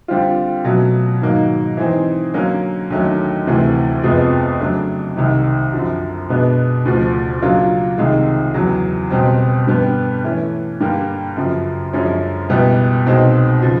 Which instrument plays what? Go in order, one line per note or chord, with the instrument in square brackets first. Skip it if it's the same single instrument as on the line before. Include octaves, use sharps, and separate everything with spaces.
[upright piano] D3 G3 C4 F4
B2 F#3 A3 C#4
G#2 D#3 F#3 A#3
E3 G#3 C4 D#4 G#4
D3 F#3 A#3 C#4
D#2 D3 F#3 A3 C#4
D2 C3 E3 A3
F2 C3 F3 G#3 B3
C#3 F#3 A3 D4
C2 C3 D#3
F#2 D3 F3
B2 G#3 B3 D4
D2 C#3 F3
C#3 F#3 A#3 D4 F4
C2 C3 D#3 G#3
E2 C#3 F#3
C#2 B2 G3 C4
G2 D3 G3 B3
E3 A3 C#4
G2 D3 G3 A#3
F#2 C#3 F3
F#2 D3 F3 G#3 C#4
C#2 B2 G3 B3 E4
C2 B2 G#3 C4 D#4
C#3 F3